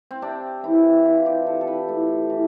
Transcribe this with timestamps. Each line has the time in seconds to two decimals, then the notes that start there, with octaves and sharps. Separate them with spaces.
0.11 C4
0.22 C3 D4
0.64 E3 E4
1.05 E3 F4
1.26 G4
1.46 C3 A4
1.61 A4
1.67 B4
1.89 A2
2.30 E3